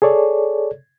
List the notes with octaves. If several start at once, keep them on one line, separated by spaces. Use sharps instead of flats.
G#4 A4 C#5 D5